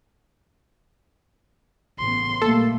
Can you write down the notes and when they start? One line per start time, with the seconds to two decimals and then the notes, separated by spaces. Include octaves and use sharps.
1.99 A1 C#3 B3 C6
2.42 A#2 G3 A3 A#3 A4